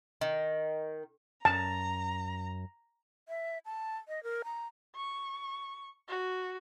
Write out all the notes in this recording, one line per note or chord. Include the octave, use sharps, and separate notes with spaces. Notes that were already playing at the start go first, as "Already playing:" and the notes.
D#3
F#2 A5 A#5
E5
A5
D#5
A#4
A#5
C#6
F#4